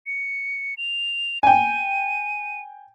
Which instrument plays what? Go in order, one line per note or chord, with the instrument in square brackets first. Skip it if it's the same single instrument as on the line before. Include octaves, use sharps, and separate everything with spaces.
[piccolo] C#7
F7
[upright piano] G5 G#5 [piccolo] D#7